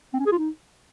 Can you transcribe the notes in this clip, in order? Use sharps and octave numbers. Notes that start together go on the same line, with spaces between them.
C4
C#4
G#4
F4
D#4